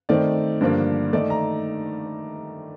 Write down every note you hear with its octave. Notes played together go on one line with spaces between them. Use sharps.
D#3 A3 C4 D#4 D5
G2 D3 F3 A#3 D4
D#3 A3 D#4 D5
A#5